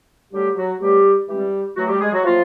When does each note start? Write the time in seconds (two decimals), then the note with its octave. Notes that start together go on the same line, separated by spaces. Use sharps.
0.31 D3 F#3 G3 A3 G4
0.56 F#3 F#4
0.80 B2 F#3 G3 A3 G4
1.27 E3 G3 G#3 C4 G4
1.76 A2 E3 F#3 A3 F#4
1.88 G3 G4
2.00 G#3 G#4
2.12 F#3 F#4
2.24 A2 F3 F#3 A#3 F4